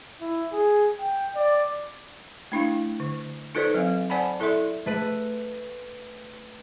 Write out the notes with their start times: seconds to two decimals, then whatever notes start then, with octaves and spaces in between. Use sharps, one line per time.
0.21 E4
0.53 G#4
0.99 G5
1.35 D5
2.52 A3 D4 E4 F5
3.00 D3
3.55 D#4 F4 A4 B4 C5 D5
3.74 F#3 C4 F5
4.10 C5 D5 F#5 G#5 A5 B5
4.40 E4 A4 D5 E5 C6
4.86 A3 B4 D#7